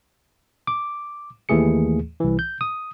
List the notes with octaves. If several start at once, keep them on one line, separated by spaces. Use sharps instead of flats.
D6
D#2 E3 A3 G#4 C#7
C2 E3
G6
D#6